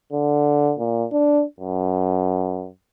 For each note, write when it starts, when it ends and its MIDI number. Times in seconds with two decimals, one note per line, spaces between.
0.13 0.74 50
0.79 1.06 46
1.12 1.43 62
1.60 2.68 42